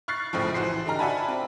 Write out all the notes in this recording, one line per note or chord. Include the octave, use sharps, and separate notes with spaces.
C#6 F6 F#6 A6 C7
A#1 F2 A2 C#3 F3
E3 F#4 C5 C7
D3 D#4 G4 A#5 F6
F#4 D5 E5 G#5 A5 B5
C4